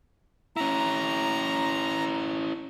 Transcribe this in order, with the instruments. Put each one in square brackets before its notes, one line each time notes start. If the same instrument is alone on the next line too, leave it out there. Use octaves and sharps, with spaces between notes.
[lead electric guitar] C#4 E4 [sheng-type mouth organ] A#5